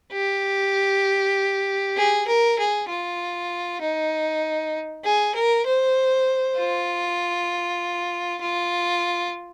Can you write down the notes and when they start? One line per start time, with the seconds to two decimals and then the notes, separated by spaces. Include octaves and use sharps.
0.13 G4
1.97 G#4
2.27 A#4
2.58 G#4
2.88 F4
3.81 D#4
5.04 G#4
5.35 A#4
5.66 C5
6.57 F4
8.41 F4